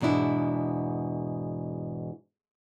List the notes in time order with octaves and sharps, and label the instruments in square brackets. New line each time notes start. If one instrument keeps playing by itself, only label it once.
[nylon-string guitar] E2 G#2 B2 D4 E4